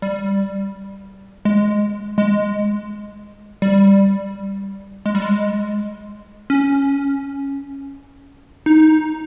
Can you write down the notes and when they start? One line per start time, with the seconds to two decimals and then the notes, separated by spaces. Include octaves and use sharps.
0.02 G3
1.45 G#3
2.18 G#3
3.62 G3
5.06 G#3
5.15 G3
5.22 G#3
6.50 C#4
8.66 D#4